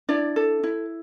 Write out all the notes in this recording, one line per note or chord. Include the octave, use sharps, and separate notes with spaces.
D4 E4 D5
A4
E4